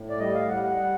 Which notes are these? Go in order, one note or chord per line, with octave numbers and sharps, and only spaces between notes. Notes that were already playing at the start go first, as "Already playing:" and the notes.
Already playing: A2
D5
G3 D#5
F5
G3 F#5
F#5
G3